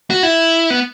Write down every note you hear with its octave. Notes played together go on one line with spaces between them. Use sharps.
F#4
E4
B3